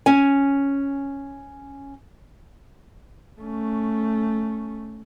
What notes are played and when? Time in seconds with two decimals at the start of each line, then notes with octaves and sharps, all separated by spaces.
0.06 C#4 G#5
3.41 A3 C#4